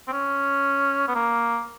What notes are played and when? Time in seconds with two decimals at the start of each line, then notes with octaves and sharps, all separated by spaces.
0.07 C4
0.12 C#4
1.08 B3
1.15 A#3